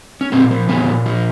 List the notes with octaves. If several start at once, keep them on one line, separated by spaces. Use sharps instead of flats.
C#4
A#2 A#3 C4
F3
A#2 B3 C#4
A#2
F3